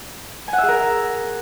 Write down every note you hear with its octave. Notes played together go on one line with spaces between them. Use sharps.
G#5
F#5
E5
G#4
A#4